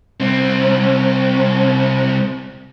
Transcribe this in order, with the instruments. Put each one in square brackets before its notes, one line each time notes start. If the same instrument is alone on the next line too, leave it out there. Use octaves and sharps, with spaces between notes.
[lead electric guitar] C2 C4